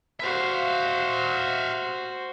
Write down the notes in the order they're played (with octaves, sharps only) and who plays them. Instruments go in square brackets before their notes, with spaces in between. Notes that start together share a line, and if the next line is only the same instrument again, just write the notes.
[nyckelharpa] F#4 C5 [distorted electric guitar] E5 F5